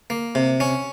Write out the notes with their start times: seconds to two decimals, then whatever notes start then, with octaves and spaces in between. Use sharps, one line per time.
0.10 A#3
0.35 C3
0.60 C#4